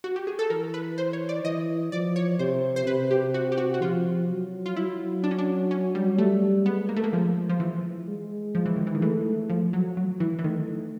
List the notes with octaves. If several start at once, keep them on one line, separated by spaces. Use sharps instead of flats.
F#4
G4
G#4
A4
E3 A#4
B4
C5
C#5
D5
E3 D#5
F3 D5
C#5
C3 C5
C5
C3 B4
G4
F#4
G4
F#4
F#4
F3 F4
F#3
F4
F#3 E4
D4
C#4
D4
C#4
G3
G3 A3
G#3 B3
A#3
A3
A#3
F3
F3
E3
G#3
F3
E3
D#3
E3
D#3
E3 A3
F3
F#3
F#3
E3
E3
D#3 A3